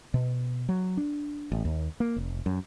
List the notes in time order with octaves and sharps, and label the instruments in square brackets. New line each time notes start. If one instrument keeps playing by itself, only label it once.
[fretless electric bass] B2
F#3
D4
A1
D#2
A#3
F1
F#2